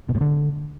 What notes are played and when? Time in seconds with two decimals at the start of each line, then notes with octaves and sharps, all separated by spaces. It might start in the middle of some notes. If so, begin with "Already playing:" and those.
0.09 B2
0.15 A2
0.21 D3